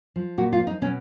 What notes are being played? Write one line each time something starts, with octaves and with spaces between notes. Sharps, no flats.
F3
A#2 F#4
F4
F3
D#4
B2 C#4